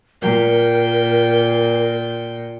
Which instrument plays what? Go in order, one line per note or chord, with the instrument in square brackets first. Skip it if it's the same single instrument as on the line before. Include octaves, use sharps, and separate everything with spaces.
[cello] A#2 [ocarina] A#4 [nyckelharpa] G5